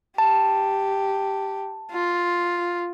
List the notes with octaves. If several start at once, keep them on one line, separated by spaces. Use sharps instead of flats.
G4 A5
F4